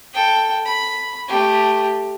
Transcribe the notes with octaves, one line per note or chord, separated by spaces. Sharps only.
A4 G5
B5
A3 G4